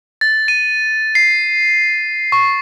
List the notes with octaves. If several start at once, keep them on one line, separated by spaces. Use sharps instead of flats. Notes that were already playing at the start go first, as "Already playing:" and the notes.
A6
D#7
C7
C#6